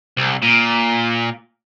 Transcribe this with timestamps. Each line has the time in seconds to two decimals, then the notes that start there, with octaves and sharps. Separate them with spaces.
0.17 C2
0.42 A#2